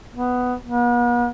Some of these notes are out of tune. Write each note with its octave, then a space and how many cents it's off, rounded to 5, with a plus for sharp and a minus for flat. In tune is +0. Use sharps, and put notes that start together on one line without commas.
B3 +10
B3 -45